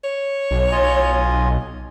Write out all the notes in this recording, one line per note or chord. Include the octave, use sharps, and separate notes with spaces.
C#5
B1
F4 D#5 G#5